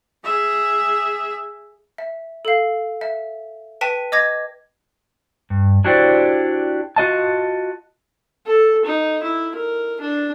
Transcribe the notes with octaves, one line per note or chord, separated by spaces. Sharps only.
G#4 E5
E5
A4 F5
E5
B4 G5 A5 B6 D#7
D#5 D6 G#6 A#6
G2
D4 E4 F#4 G4 C5 D5
F4 F#4 D#5 A5
A4
D#4
E4
A#4
D4